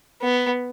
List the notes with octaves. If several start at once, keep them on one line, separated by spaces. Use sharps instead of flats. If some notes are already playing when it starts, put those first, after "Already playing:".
B3